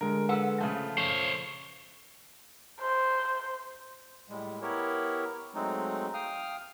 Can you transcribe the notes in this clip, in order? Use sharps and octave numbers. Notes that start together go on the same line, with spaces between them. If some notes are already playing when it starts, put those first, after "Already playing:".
D3 G#3 A#4
A4 B4 F#5 E6
C#3 F3 A3
F3 C5 C#5 C#6 F6
C5
A2 G3 G#3
B3 E4 G4 A#4 C#5
F#3 G#3 A3 C4 D#4
F5 G5 D#6 F6